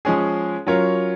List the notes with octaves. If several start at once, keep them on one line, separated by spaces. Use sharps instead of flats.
F3 G#3 C#4 G#4
F#3 C#4 F4 A#4 C#5